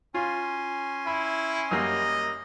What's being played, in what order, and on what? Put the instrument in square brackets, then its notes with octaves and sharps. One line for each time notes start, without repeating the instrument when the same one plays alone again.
[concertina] C#4 G#5 C6 [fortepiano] F4
[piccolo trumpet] E4 [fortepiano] B5
[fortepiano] F#2 G3 A#3 [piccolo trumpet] D#5